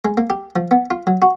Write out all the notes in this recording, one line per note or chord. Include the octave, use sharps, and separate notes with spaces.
G#3
A#3
G4
F3
B3
F4
F#3
F#4